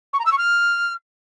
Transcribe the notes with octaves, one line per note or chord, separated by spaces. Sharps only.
C#6
A#5
E6
C#6
F6